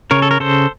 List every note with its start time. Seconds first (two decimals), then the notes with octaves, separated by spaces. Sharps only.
0.11 C#3 A#4 C#5
0.22 A4
0.31 A#4
0.40 C#3 A4 C5